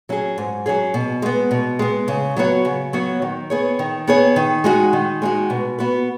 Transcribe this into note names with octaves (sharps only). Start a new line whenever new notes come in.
F#3 C#4 G#4
G#2
F#3 C#4 G#4
B2
G#3 B3
B2
G#3 B3
C#3
F#3 B3 F#4 C#5
C#3
F#3 B3 F#4 C#5
D#3
B3 G#4 C#5
D#3
B3 G#4 C#5
D#3
G#3 D#4 F#4
D#3
G#3 D#4 F#4
B2
B3 F#4 B4